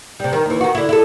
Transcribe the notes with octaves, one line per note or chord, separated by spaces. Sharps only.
C3 G3
D#3
D#2 E3
D#3 F#4
D3 E4
E4 A4